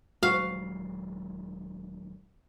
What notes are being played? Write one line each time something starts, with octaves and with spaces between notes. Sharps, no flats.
D#1 F#3 G#3 F#4 F5